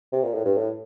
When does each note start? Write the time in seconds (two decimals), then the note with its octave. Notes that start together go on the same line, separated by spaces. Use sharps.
0.13 C3
0.23 A#2
0.35 A2
0.45 G2
0.58 A2